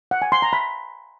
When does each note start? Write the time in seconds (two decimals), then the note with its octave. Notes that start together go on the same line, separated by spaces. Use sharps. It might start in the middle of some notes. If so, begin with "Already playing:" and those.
0.11 F#5
0.22 G#5
0.32 C6
0.42 A#5
0.53 B5